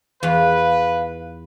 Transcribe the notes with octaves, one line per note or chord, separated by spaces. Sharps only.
E2 F4 B4 F5